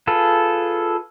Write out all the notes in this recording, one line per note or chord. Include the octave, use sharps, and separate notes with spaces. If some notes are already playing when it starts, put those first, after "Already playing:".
F4 G#4 A4 B4